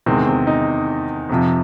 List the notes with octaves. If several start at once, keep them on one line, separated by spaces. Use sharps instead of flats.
E2 C3 D#3 G#3 C4
C4
D#4
F2 C3 F3